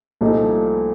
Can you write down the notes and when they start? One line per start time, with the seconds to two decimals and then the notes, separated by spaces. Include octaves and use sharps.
0.21 C2 A#2 F3 A3 D#4